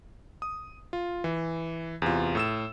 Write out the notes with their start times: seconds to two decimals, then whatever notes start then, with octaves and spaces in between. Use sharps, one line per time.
0.42 D#6
0.93 F4
1.24 E3
2.02 E2 C3 F4
2.35 A2 E6 E7